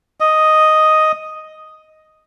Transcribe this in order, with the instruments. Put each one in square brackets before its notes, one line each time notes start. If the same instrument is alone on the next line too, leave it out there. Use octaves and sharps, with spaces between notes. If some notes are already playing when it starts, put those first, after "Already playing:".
[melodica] D#5